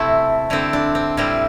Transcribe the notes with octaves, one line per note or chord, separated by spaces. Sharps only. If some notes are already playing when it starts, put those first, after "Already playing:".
Already playing: C3 A3 C4 E4
D3 C4 E4
D4
C4
A2 G3 C4 E4